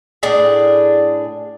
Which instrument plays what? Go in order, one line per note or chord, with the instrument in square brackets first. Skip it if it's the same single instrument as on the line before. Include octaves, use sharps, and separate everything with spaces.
[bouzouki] A2 D4 G#4